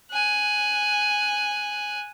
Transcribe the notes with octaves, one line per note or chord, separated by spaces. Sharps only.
G#5 F#6